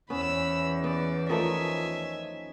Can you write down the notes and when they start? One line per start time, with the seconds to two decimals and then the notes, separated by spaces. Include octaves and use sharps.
0.10 E2 B3 C#4 B5 E6
0.84 B3 D5
1.30 D#3 F3 A3 D#5 E5 G#5